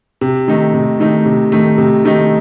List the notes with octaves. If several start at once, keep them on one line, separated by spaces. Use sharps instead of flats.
C3
D#3 A3 D#4
C3
D#3 A3 D#4
C3
D#3 A3 D#4
C3
D#3 A3 D#4